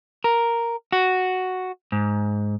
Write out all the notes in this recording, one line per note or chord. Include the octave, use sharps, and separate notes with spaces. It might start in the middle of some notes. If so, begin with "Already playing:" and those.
A#4
F#4
G#2